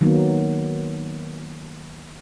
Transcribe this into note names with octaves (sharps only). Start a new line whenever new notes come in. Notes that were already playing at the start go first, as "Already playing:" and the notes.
D#3 F#3 A#3 B3